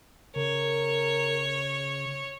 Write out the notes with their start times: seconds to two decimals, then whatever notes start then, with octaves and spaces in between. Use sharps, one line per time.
0.36 C#3 A#4 C#5